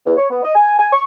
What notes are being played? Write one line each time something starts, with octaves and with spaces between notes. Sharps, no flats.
E2
C#5
B3
D#5
G#5
G#5
C#6